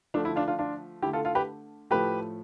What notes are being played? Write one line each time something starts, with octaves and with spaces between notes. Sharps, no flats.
D3 F3 A3 D4
E4
D4 F4
D4 F4
D4 F4
D3 A3 E4 G4
F4 A4
F4 A4
G4 B4
A2 F3 A3 G4 B4